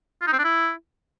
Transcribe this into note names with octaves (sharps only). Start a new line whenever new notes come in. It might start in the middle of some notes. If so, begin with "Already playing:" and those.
F4
D#4
C4
D4
E4